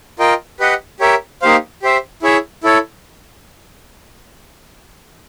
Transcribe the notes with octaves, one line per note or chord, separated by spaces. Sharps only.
F4 A#4 D#5 G5
G4 B4 D#5 F#5
G4 A#4 C#5 E5
A#3 D#4 G4 C5 F5
G4 C5 E5
E4 G#4 C#5 E5
E4 A4 C#5